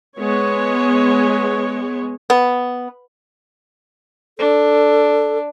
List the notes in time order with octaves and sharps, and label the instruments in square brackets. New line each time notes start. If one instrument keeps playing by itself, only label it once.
[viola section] G#3 B3 C#5
[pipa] B3
[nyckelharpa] D4 [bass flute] A4